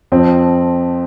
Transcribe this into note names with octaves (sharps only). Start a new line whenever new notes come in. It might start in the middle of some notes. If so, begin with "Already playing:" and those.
F2 F3 C4